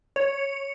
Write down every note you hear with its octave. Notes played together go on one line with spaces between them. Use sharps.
C#5